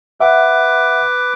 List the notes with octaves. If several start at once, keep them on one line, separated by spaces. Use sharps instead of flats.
B4 E5 F#5 D6